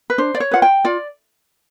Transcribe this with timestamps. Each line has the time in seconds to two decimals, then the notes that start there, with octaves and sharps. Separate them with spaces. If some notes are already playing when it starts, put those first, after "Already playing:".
0.10 B4
0.18 D4 C5
0.35 D5
0.40 C#5
0.51 F4 G#4 B4 F#5
0.62 G5
0.85 F4 D5